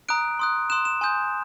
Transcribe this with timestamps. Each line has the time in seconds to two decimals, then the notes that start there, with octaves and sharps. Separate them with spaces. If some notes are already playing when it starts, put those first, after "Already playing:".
0.09 A#5 D#6 F#6 D7
0.39 C6 D#6 F#6
0.70 C6 D#6 F#6 E7
0.85 E7
1.01 G#5 C6 D#6 G6